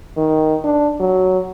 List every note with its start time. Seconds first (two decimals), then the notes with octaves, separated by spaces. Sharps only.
0.17 D#3
0.64 D4
1.00 F#3